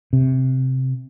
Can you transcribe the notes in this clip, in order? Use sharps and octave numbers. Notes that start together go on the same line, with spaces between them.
C3